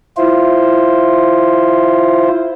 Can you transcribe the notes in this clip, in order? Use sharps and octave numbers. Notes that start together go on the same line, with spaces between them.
E4 F4 C5